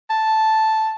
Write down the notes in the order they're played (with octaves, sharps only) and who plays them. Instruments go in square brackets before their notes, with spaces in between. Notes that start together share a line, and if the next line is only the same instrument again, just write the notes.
[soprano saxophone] A5